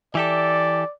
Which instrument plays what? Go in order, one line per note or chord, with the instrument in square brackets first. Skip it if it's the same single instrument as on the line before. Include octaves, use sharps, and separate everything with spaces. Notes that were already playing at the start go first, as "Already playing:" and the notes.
[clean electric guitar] E3 G4 A4 [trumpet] D5